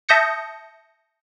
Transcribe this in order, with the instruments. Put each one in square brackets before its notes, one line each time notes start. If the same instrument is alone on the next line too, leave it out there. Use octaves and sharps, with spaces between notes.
[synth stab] E5 A5 D#6 G6 A#6 C#7